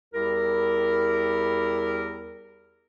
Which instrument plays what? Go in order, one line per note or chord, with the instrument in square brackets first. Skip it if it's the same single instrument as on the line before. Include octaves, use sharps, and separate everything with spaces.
[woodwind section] E2 G3 E4 G4 A#4